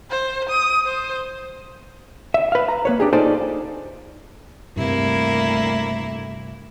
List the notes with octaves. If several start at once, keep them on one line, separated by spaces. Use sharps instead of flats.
C5
D#6
C5
E5
B4 F5
A#5
A#3 B4 C#5
D4 G4 G#4
D#4 F4 G#4 A4 C5 D5
D2 G2 C3 A#3 E4